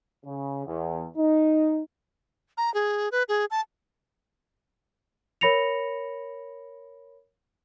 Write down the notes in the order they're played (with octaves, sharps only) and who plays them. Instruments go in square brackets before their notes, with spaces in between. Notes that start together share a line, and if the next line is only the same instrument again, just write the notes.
[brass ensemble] C#3
E2
D#4
[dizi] A#5
G#4
B4
G#4
A5
[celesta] A#4 C#5 B5 A#6 C#7 F7